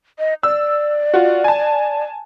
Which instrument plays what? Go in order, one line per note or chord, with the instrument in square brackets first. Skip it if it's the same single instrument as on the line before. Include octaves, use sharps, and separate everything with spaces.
[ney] D#5
[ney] D5 [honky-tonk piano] E6
[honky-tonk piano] F4 F#4
G#5 A5